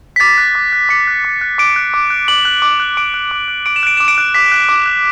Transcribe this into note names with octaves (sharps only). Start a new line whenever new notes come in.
B6
D6 A6
F#6
D6
F#6
D6 C#7
F#6
D6
F#6
D6 D7
F#6
D6
F#6
D6 F#7
F#6
D6
F#6
D6 D7
F#6
D6
F#6
D6 D7
E7
F#6 D7
D6 E7
D7
F#6
D6 B6
F#6
D6
F#6